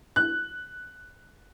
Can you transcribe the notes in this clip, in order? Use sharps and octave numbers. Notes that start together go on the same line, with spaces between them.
F#6